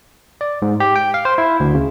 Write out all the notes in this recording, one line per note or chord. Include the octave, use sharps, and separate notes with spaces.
D5
G#2
G4
G5
F5
C5
E4
D2
C#3